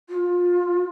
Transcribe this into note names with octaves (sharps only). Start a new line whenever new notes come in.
F4